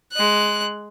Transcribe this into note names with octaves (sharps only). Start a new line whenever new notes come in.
G#3 F#6